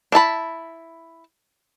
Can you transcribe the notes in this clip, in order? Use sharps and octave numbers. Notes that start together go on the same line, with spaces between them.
D4 E4 A5 B5